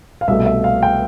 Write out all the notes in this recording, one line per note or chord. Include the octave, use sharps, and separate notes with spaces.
F5
C2 B2 A3 E5
E5
F5
G5